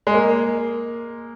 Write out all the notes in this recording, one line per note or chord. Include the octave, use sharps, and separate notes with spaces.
G#3
A#3